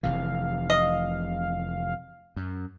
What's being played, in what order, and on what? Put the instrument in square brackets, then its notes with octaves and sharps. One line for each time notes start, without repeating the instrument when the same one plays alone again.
[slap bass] F1 C3 E3 [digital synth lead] F5
[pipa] D#5
[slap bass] F#2